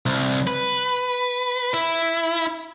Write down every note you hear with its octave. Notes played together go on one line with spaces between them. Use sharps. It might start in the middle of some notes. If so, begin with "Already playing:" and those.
C2
B4
E4